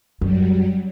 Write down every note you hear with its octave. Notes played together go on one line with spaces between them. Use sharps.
F#2 F#3 G3